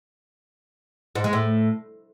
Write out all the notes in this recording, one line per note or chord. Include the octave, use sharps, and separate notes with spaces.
G#2
G#3
A2